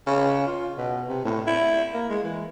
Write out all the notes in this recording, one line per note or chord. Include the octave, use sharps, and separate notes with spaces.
C#3
F4
B2
C3
A2
E4
A#3
G#3
E3